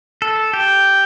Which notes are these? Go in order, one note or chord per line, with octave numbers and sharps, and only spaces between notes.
A4
G4